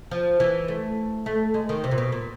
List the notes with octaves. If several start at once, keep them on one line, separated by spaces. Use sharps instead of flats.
F3
E3
A3
A3
G#3
D#3
C3
A#2
B2
A#2